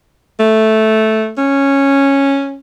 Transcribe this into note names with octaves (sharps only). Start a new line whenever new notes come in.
A3
C#4